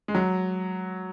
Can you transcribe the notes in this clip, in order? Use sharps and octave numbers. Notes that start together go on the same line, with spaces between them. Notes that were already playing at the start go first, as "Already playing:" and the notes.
G#3
F#3